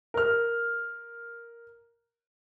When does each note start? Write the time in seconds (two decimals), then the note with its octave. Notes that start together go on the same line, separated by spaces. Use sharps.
0.14 A#4 F6